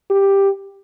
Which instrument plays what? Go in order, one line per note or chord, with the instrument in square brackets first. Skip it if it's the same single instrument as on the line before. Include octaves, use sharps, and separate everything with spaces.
[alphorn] G4